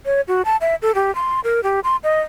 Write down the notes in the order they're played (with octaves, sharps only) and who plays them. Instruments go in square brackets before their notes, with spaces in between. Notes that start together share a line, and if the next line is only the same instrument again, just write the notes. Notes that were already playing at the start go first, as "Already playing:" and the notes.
[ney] C#5
F#4
A5
E5
A4
G4
C6
A#4
G4
C6
D#5